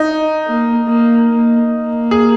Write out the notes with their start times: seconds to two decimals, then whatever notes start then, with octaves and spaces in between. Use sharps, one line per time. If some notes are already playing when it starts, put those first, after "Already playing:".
Already playing: D#4
0.47 A#3
0.88 A#3
1.29 A#3
1.71 A#3
2.11 G#4